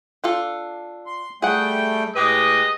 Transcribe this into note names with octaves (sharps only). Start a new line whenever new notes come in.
D4 F4 A4
C6
G3 A3 G#4 F#5 G5
A2 G#3 G4 B4 D#5